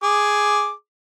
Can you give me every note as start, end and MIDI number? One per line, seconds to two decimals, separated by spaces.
0.03 0.72 68
0.03 0.72 86